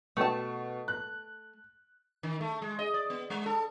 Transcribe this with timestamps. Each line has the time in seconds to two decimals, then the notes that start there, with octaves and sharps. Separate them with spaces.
0.17 B2 A3 A5
0.88 F#6
2.23 D#3
2.41 A3
2.62 G#3
2.79 D#5
2.94 D5
3.10 B3
3.30 G#3
3.46 A4